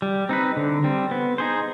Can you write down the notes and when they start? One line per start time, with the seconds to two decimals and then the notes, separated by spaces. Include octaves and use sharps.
0.02 G3
0.29 C4 D#4 B4
0.57 D3
0.84 G3 C4
1.11 B3
1.38 D#4 G#4 C5